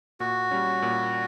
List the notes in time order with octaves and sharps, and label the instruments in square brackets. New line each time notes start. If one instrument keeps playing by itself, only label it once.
[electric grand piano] A#2 [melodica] F#4
[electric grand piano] G3 C#4
A#2